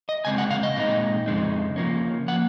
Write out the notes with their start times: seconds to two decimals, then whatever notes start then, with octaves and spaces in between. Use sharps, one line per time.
0.09 D#5
0.25 C#3 G#3 C4 G#5
0.38 F#5
0.51 F5
0.63 D#5
0.76 A#2 G#3 C4 D#4
1.26 F2 C#3 G#3 C4 D#4
1.76 C#3 F3 A#3 C#4
2.28 F3 A#3 F#5